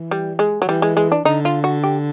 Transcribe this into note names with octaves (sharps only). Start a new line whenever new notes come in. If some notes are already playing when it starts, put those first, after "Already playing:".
Already playing: E3
G3
G#3
F#3
E3 G3
G#3
G#3
D4
D3 D#4
F4
F#4
G4